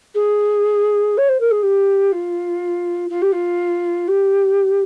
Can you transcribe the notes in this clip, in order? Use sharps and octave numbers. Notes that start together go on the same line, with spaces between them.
G#4
C#5
C5
A#4
G#4
G4
F4
F4
G4
F4
G4